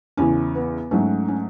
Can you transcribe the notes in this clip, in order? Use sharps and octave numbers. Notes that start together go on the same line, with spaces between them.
E2 C#3 E3 C#4
B3
G#2 F#3 A3 C#4
C#4